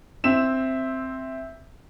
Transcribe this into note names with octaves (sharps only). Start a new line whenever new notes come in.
C4 E5 E7